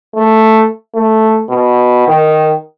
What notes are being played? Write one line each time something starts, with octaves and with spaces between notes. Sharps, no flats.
A3
A3
B2
D#3